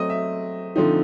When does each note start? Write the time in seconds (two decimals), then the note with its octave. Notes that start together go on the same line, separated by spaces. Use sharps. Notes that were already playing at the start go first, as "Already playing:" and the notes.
Already playing: F#3 A3 C4 D#5
0.10 E5
0.76 D3 F3 A3 C4 D#4